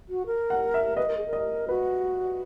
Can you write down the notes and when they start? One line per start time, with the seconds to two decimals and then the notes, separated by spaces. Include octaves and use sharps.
0.09 F#4
0.26 A#4
0.50 F#5
0.74 E5
0.97 B4 D#5
1.07 A#4
1.17 G#4
1.26 A#4
1.33 D#5
1.68 F#4 B4